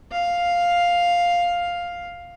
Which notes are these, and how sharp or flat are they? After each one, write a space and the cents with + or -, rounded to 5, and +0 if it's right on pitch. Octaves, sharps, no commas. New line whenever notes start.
F5 +5